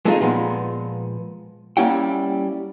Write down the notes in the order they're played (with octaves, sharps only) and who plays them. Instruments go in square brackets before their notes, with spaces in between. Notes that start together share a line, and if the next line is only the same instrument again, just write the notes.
[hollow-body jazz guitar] G#3 A3 C4 D#4 F4 G#4
A#2 F3 G#3 B3
G3 A#3 C#4 E4 F#5 G5